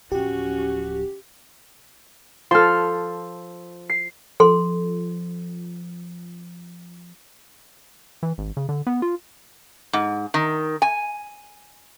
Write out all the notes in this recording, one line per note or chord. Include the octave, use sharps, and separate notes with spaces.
D1 F3 C#4 F#4 G4
F3 A4 C6 F6
C7
F3 A4 C6
E3
G#1
C#3
D3
B3
F4
G#2
D#3
G#5